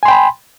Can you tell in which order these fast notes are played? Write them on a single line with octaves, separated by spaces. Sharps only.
G#5 C6 G5 B5